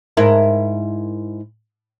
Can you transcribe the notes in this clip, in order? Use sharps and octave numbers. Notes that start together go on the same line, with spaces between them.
G#2 E4 A#4